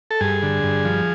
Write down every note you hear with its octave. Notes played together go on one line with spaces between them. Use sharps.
A4
G2 G#4
D3
G2
F3